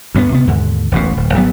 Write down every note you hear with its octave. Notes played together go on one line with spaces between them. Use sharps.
D2 G2 A#3 B3
C3 B3
D#2 G#2 D3
E1 A1 F#2 B2
D1
G#1 F#3 G3 B3